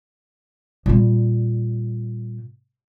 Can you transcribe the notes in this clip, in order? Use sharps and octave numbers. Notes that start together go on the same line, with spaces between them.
A#2 G3